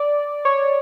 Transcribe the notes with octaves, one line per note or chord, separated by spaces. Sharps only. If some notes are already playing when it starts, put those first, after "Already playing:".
Already playing: D5
C#5